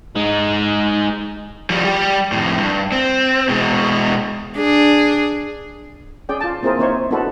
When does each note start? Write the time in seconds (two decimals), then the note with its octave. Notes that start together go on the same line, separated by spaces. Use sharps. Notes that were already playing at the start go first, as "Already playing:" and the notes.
0.15 G#3 D#4
1.70 F3 G3
1.84 G3 G4
2.32 F2 A2
2.59 G2
2.92 C4
3.49 B2 G#3
4.57 D4 G#4
6.29 C#4 G#4 D5 G5
6.41 F4 A5
6.63 A#3 C4 E4 G#4 A#4 C5
6.79 A#3 C4 D#4 E4 C5 C#5
7.11 B3 D4 E4 F#4 A4 B4